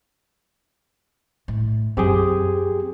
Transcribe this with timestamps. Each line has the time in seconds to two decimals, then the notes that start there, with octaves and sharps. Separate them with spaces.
1.48 A2
1.97 F#2 F#3 C4 G4 G#4